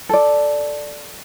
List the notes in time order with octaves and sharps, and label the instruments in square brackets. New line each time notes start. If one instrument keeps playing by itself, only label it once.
[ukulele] A4 D5